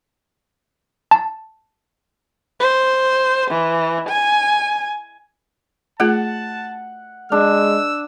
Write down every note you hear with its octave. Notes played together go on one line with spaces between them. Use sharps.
A5
C5
E3
G#5
A3 F4 G#4 F#5 A5
G#3 D4 E6